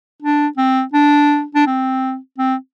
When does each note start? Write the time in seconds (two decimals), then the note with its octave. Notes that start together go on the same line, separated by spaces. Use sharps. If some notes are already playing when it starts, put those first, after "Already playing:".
0.22 D4
0.57 C4
0.93 D4
1.55 D4
1.67 C4
2.38 C4